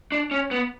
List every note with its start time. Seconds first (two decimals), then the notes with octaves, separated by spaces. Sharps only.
0.12 D4
0.31 C#4
0.51 B3